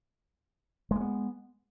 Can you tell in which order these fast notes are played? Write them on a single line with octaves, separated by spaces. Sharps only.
G#3 A#3 B3